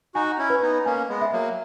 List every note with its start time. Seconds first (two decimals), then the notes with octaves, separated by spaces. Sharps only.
0.15 D#4 F#4 G#5
0.38 C#4 E4
0.50 B4
0.62 B3 D#4
0.86 A#3 C#4 G#5
1.09 G#3 B3
1.21 E5
1.32 F#3 A#3